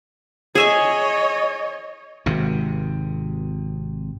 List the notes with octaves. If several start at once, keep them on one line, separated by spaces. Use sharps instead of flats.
G#4 C#5 D#5 E5 G#5
G#1 C3